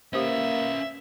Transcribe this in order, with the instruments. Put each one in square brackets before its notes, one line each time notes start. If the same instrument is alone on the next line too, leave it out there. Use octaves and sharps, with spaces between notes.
[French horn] A#3 [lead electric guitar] C#4 B4 [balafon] G4 C5 [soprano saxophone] E5